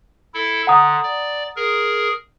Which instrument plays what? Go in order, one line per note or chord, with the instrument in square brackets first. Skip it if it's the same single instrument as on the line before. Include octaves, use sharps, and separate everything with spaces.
[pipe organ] E4 A4
[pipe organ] D3 [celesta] F#5 A#5 D#6
[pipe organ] D5
G#4 A#4